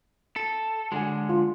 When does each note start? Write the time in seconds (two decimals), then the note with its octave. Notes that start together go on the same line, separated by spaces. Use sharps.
0.36 A4
0.92 D3 G#3 F#4 G#5
1.29 F4